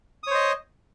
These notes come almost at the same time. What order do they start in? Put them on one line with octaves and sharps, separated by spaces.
D#6 C#5 C5 D#5